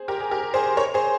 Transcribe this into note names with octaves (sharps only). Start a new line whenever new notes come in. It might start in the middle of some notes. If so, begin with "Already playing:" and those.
Already playing: G#4 C5
G4 A#4
G#4
G4 A#4
G#4 C5
A#4 C#5
G#4 C5